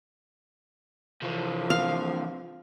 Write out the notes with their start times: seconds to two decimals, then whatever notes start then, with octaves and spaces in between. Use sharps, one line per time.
1.22 C3 E3 F3
1.70 F5